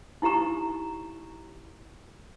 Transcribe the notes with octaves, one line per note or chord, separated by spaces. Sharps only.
D#4 E4 G4 A#5 C#6